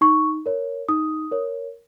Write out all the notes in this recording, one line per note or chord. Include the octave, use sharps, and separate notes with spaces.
D#4 C#6
A#4 C#5
D#4 D#6
A#4 C#5